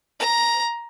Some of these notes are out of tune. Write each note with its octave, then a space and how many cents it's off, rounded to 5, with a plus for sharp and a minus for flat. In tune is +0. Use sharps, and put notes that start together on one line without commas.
A#5 +10